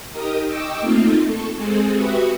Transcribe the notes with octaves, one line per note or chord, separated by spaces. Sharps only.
D#4 G4 A#4 D#6
D#5 G5 C#6 D6 E6
A3 A#3 C4 D#4 F4
A4 C#6
G#3 C4 G#4 A4
F#4 G4 B4 E5 C#6 D#6